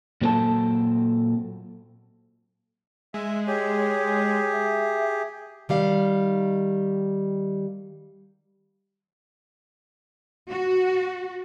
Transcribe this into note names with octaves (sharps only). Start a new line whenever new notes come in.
A#2 F#3 G3 C4 A4 A5
G#3 E5
G4 G#4 C#5
E5
D#3 G3 F5
F#4